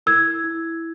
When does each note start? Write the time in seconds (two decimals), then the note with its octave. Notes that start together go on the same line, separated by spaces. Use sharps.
0.06 E4 E6 G#6
0.44 E4